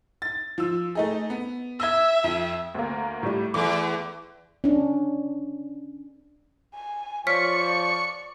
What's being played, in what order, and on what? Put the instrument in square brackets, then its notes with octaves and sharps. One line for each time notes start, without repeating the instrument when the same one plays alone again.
[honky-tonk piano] A6
F3 E6
A3 D#4 G#4
B3
[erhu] E5 [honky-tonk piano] E6 G#6
[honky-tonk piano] F2
D2 A#3
A2 G3
[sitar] E2 [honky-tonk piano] A3 D6
[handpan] C#4 D4
[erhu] G#5
[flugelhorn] F3 [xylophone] C#5 F6 B6 [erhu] D5 [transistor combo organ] C#6